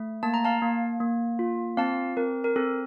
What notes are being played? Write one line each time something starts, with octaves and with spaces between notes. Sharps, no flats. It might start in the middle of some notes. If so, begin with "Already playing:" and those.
Already playing: A3
A#3 A5
A#5
F5 A5
A#3
A#3
F4
C4 F5 A5
C4 A#4
A#4
C4 A4